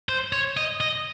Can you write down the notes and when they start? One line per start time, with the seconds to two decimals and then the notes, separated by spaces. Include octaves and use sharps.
0.09 C5
0.33 C#5
0.57 D#5
0.80 D#5